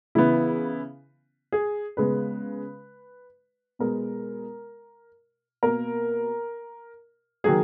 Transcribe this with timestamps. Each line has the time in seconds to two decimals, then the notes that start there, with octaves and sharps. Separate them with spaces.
0.15 C#3 E3 B3 E4
1.52 G#4
1.97 C#3 G#3 B3 B4
3.79 B2 G#3 B3 A#4
5.63 B2 A#3 A#4
7.44 D#3 F#3 A#3 G#4